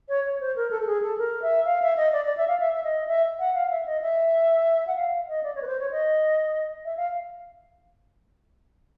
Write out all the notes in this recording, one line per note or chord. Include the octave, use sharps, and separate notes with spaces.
C#5
C#5
C5
A#4
A4
A4
G#4
A4
A#4
E5
F5
E5
D#5
D5
D5
E5
F5
E5
E5
D#5
E5
F#5
F5
E5
D#5
E5
F#5
F5
D#5
D5
C#5
B4
C5
C#5
D#5
E5
F5